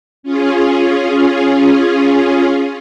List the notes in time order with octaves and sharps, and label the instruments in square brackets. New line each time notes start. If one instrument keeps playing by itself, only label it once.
[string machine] C#4 F4 G#4